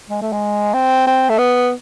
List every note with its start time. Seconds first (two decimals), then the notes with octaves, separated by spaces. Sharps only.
0.10 G#3
0.21 A3
0.32 G#3
0.74 C4
1.07 C4
1.29 A3
1.38 B3